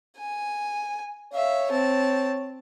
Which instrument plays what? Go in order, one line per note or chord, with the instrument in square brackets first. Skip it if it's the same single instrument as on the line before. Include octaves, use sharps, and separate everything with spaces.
[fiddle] G#5
[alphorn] C#5 [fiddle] E5 F5
[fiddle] C4 A5